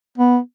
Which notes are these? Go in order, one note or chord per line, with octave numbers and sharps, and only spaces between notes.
B3